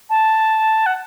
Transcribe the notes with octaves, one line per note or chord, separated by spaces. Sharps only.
A5
F#5